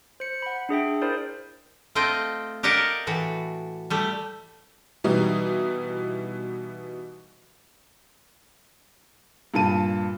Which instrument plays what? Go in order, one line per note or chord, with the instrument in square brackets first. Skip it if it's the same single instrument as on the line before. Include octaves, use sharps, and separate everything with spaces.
[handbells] C5 C#7
F#5 B5
D4 G#4 E5 G5
E4 A#4 C5 D5
[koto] A3 C4 F4 D#5 G5
G4 A#4 D5 D#5 F5 F#5
A2 E3 F#4
G3 A3
[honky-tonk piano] B2 E3 G3 D#4
[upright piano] G2 A#2 A5 D#7